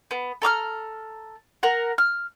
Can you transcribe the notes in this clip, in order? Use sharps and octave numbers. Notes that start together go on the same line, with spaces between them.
B3
A4 A#5 D6 F6
A#4 F#5
F6